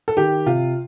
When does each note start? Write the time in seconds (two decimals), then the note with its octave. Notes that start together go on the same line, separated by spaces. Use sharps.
0.08 A4
0.17 D#3 G4
0.46 C3 F4